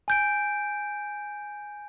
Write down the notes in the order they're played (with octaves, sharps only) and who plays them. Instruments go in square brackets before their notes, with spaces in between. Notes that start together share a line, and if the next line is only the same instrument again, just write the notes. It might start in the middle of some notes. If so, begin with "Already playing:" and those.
[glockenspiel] G#5 G6 D7